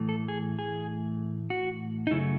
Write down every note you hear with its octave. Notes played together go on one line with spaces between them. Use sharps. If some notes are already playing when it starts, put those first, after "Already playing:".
Already playing: A2 E3 A3
A4
G#4
G#4
F#4
D#4
F#2 C#3 F#3 A3 E4